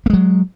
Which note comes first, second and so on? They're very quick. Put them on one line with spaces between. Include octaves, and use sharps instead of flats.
A#3 G#3 F#3